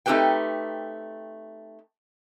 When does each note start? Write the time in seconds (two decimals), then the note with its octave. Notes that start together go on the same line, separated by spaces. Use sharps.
0.06 A3 C4 D#4 G4 B4 G5